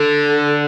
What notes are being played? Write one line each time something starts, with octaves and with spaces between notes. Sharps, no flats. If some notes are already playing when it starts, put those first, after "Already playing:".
Already playing: D3 A4